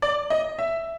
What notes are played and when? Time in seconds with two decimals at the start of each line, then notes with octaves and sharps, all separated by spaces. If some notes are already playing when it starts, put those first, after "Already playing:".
0.02 D5
0.30 D#5
0.58 E5